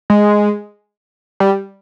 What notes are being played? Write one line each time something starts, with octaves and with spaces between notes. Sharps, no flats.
G#3
G3